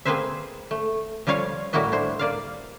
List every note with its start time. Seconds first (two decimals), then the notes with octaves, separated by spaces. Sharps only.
0.05 A#3 C4 G#4 B4 C5 E5
0.71 A3
1.27 F3 G3 F4 C#5 F5
1.73 A2 G3 A#3 E4 F#4 D#5
1.92 D4 E4 C5
2.19 A#3 D5 F5